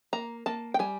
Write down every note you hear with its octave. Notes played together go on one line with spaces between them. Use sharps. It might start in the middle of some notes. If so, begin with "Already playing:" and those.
A#3 A#5
A#3 A5
G5
G3 G#5